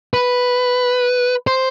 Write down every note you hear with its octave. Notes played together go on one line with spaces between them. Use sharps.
B4
C5